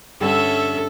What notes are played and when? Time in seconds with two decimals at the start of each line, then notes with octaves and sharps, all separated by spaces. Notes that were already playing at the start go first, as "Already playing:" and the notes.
0.21 G2 D3 C#4 A4 E5